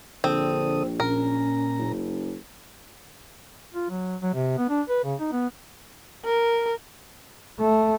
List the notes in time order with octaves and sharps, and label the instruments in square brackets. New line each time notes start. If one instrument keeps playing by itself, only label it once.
[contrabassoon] A#1 [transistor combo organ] D3 A4 D#6 [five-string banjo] C4
[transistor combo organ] A#2 A#5 [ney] C#4 [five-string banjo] A#4
[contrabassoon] F#1
[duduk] F4
F#3
F#3
C3
B3
D4
B4
C#3
D#4
B3
[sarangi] A#4
[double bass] A3